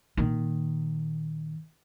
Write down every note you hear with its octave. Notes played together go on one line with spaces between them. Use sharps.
A#2 D#3